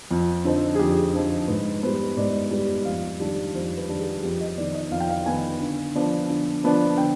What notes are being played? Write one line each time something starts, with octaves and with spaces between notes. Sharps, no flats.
F2
D3 F3 C4 D#4
G#4
F2 G4
D3 F3 C4 D#4
G#2 B4
G3 B3 C5
G#2 D5
G3 B3
F2 F5
D#3 G3 D4
F2 C5
B4
D#3 G3 D4
G#4
F2 G4
D#5
D#3 B3 D5
D#5
F2 F5
G5
F5
D#3 B3 G#5
D3
F3 B3 D4
D3
F3 B3 D4
D3 G5